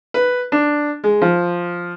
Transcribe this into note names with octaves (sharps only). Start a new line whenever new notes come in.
B4
D4
G#3
F3